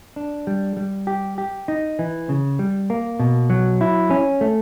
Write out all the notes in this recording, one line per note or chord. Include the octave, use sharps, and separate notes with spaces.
D4
G3
G3
G4
G4
D#4
E3
C#3
G3
A#3
B2
F#3
E4
C#4
A3